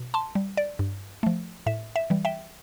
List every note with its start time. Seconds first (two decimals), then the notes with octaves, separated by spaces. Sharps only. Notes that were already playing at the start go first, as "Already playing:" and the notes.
Already playing: B2
0.14 A5 C6
0.35 G3
0.57 D5
0.79 G2
1.23 F3 A3
1.66 A2 E5
1.96 E5
2.10 E3 G3
2.25 E5 G5